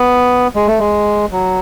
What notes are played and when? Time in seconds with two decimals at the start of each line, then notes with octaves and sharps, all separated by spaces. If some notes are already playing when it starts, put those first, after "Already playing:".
Already playing: B3
0.55 G#3
0.67 A3
0.79 G#3
1.32 F#3